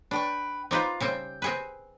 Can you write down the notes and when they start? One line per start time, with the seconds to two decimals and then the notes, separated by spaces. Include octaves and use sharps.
0.11 D4 B4 G5 C#6
0.71 C4 D#4 F4 A#4 B4 D6
1.00 C#3 G3 C4 G5
1.42 C4 G#4 B4